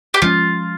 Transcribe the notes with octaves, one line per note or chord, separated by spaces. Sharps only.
G4
F3 G#3 C#4 F4